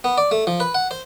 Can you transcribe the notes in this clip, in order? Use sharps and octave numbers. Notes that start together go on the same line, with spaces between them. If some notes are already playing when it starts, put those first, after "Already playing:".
B3
D5
A3
F3
B4
F#5
C5